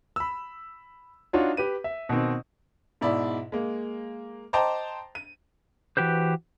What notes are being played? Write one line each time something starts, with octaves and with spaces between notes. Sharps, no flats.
B5 E6
D4 D#4 F4 F#4 C#5
G4 B4 D#7
E5
B2 D#3 C4
G#2 B2 E4 D5 B5
G#3 A#3
C5 D#5 G5 A5 A#5 D6
D#7
E3 F#4 G4 B4 C5